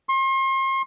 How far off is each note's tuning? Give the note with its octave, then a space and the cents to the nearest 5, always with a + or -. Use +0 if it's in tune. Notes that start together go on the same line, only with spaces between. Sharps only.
C6 +40